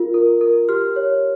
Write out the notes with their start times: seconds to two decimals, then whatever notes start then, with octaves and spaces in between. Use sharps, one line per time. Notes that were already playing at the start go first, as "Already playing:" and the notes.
Already playing: F4 A#4
0.14 A#4
0.41 A#4
0.69 G4 F6
0.96 C#5